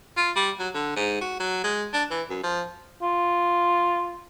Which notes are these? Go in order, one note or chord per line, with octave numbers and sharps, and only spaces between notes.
F4
G3
F#3
D3
G#2
F#4
F#3
G#3
D4
E3
F#2
F3
F4